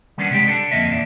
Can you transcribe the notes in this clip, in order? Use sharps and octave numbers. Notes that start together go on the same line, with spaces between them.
D#3 G3 B3 C#4 D4
C3 G#3 G4 D5 G5
D4 A4 D5
F2 B2 D3 A#3 D#5 E5
E2 A#2 D4